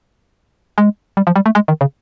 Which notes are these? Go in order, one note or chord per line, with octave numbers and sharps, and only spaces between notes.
G#3
G3
F3
G3
A3
G#3
D#3
C#3